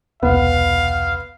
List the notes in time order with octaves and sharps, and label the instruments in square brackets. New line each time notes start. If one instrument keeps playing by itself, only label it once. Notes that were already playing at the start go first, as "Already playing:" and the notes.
[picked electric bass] E1 C2 [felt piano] B3 [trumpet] F5